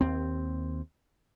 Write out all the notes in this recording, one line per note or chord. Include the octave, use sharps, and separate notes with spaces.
D#2 C4